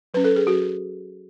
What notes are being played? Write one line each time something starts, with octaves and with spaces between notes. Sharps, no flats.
F#3 C#4 B4
A4
G#4
F#3 C#4 F#4